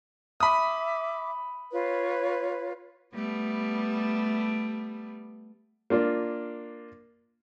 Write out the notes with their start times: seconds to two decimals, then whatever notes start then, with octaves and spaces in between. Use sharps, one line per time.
0.40 E5 B5 D6 D#6
1.71 F4 B4 C#5
3.14 G3 A3 B3
5.90 A#3 D4 F4